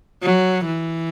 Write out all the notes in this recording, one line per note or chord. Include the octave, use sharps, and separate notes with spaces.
F#3
E3